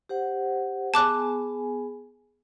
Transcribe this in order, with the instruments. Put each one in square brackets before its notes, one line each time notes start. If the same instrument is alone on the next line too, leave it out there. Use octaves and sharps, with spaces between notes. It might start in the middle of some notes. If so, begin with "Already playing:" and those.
[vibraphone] G4 C5 F#5
[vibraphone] B3 G#4 G#5 [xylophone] A5 D6 F#6